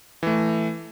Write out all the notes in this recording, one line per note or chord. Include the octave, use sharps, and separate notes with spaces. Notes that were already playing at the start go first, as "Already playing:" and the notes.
E3 A3